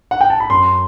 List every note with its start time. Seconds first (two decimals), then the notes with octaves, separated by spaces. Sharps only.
0.11 F#5
0.21 G5
0.30 A5
0.40 B5
0.50 F#2 C6